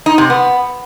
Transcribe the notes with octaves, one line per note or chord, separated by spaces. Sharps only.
D#4
C3
B3